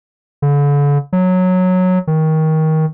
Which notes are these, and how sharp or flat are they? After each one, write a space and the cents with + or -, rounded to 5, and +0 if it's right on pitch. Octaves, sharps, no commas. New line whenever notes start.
D3 -40
F#3 -10
D#3 +20